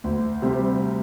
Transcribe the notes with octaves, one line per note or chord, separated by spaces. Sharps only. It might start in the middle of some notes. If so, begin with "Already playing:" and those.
D2
C3 G3